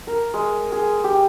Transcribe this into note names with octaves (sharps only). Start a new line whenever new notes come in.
A#4
G#3
G#4
G4